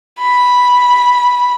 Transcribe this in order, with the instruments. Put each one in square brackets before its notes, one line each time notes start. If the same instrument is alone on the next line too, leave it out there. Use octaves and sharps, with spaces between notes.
[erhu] B5